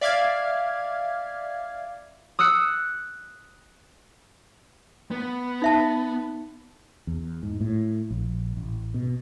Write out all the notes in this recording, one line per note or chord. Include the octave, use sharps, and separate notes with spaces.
D5 E5 F5 D6 F6 G#6
D#6 E6 F#6 C#7
B3
D#4 E5 A5
E2
G#2
A2
A#1
A1
B2